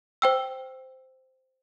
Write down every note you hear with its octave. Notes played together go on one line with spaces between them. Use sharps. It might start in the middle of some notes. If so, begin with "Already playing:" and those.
C5 G5 E6